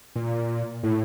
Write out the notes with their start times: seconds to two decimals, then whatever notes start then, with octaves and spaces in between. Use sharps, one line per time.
0.16 A#2
0.83 A2